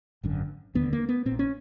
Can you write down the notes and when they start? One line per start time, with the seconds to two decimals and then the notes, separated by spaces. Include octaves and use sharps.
0.23 G#1 F#2 D3
0.74 E1 D#2 D3 B3
0.93 A#3
1.09 B3
1.26 A#2 C4
1.31 A#1
1.39 C#4